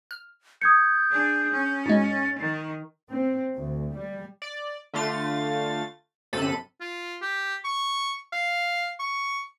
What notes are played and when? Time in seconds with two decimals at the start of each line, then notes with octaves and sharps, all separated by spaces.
0.11 F6
0.62 D#6 G6 G#6 C#7
1.11 D4 G#4
1.52 C#4
1.86 G#2 B2 G#3 A6
2.39 D#3
3.11 C4
3.57 D2
3.96 G3
4.42 D5
4.94 D3 A3 F4 A6
6.33 G1 F#2 C3 A4 B5 D#7
6.81 F4
7.22 G4
7.64 C#6
8.32 F5
9.00 C#6